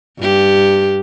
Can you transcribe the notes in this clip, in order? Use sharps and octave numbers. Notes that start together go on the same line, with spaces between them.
G2 G4